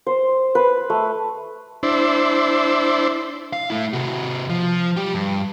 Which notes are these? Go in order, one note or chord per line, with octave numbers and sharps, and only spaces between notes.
C5
B4
A3
D4 E4 C5
F5
A3 E4
C3 F#4
F3
G3 G4
G2